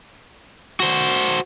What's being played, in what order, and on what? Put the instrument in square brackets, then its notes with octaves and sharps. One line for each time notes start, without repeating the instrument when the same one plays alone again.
[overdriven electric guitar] F#4 C5